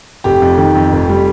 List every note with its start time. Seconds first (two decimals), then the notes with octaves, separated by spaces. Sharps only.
0.24 F1 G4
0.42 F2
0.58 D#3
0.75 F2
0.93 F1
1.09 G3